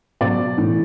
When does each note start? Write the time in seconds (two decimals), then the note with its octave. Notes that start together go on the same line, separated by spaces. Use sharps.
0.21 B2 F#3 D5
0.57 A2 E3